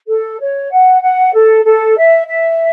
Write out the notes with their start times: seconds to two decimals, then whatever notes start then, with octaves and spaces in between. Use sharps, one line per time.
0.08 A4
0.40 C#5
0.71 F#5
1.01 F#5
1.33 A4
1.64 A4
1.96 E5
2.27 E5